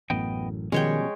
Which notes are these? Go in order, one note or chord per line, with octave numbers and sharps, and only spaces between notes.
A1 F#2 A2 B3 D#5 G5
B2 D#3 F3 G3 G#3 C#4 C#5 G5